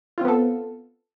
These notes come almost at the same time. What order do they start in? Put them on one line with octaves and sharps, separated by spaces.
F4 C4 B3 A4